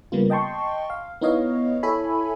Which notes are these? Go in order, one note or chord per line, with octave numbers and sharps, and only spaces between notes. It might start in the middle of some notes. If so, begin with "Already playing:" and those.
C#3 G3 A#3 B3 F4
D#5 G5 A5 C6 C#6
F5
B3 D#4 E4 C#5 D#5 F5
E4 A4 C#5 E5 G#5 B5